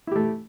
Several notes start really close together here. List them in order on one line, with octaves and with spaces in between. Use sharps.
E4 G4 A3